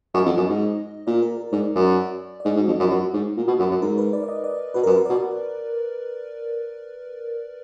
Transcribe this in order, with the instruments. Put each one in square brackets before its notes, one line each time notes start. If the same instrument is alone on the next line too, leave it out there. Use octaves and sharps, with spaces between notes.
[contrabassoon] F#2 [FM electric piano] D#5
[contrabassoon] F2
F#2
G#2
[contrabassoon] A#2 [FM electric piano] D5
[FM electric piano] A#4
A#4
[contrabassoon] G#2 [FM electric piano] D5
[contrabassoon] F#2
[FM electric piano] D5
[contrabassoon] G#2 [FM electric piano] D#5
[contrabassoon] G#2
[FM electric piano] F#4
[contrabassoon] F2
[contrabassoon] F#2 [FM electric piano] F4
[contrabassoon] F#2 [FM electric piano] F#4
[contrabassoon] G#2
A#2
B2
F#2
F#2
[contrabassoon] G#2 [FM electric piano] A#4
[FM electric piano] B4
D5
D5
D#5
D5
[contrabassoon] B2 [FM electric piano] B4
[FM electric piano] A#4
[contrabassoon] F#2
[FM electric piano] B4
[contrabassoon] B2 [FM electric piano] D5